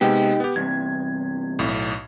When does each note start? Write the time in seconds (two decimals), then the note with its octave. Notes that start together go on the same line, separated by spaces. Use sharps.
0.01 C3 G#3 B3 D#4 G4
0.40 B3 G4
0.56 E2 G2 C3 G#6
1.59 B1 A2